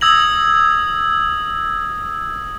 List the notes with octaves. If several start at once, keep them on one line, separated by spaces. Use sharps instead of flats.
D#6 E6 G#6 A#6 F#7